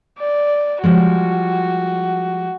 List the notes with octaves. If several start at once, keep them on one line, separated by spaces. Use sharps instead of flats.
D5
F3 G3 G#3 F#4